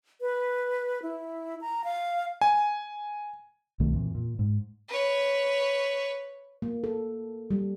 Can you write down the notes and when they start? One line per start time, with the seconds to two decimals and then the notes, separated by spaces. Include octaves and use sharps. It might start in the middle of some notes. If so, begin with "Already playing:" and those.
0.21 B4
1.02 E4
1.61 A#5
1.84 F5
2.41 G#5
3.80 C2 B2 D#3 A3
3.94 F2 A#2 E3
4.15 A#2
4.39 G#2
4.89 B4 C#5
6.62 A#3
6.84 A4
7.51 G3